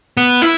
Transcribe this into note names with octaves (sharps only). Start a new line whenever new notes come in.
B3
E4